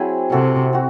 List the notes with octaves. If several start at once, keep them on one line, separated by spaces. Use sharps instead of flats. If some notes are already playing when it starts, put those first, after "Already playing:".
Already playing: F#3 C4 E4 G#4 C5
C3 C4 F#4 A4
C4 F#4